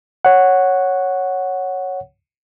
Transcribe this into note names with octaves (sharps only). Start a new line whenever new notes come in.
C#5 F#5